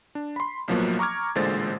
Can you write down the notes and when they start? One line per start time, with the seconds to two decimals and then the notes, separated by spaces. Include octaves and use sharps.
0.15 D4
0.36 B5 C6
0.68 B1 A2 F3 F#3 A#3 B3
0.99 A#5 C#6 D6 F6 G#6
1.35 A1 A#2 D3 G#3 C5 A6